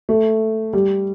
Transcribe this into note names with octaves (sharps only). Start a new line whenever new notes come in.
A3
G3